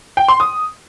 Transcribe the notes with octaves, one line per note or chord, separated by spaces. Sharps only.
G5
C6
D#6